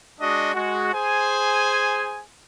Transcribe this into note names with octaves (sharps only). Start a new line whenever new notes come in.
G#3 D4 F#4 D#5
G#3 F#4
G#4 C5 G#5